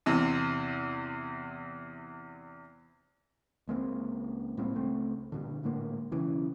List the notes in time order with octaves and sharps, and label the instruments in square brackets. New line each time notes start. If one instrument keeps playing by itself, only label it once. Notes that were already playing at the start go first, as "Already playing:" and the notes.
[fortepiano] E2 C3
[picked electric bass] C#2 G#3 A#3 C4
A2 G3 A#3 C4
C#2 A3 C4
G2 A#2 D3
A2 D3 G#3 A#3
B1 C#3 E3